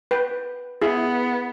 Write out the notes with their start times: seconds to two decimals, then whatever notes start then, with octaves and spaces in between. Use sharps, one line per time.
0.11 B4 G5
0.82 B3 E4 G#4